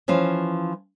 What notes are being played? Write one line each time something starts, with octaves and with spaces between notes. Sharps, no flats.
E3 F3 C#4 F4